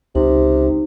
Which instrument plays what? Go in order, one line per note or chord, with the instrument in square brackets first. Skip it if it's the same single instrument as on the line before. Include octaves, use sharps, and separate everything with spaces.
[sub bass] C#2 [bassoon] C3 [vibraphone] D#4